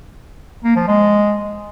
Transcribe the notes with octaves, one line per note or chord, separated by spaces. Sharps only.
A#3
F3
G#3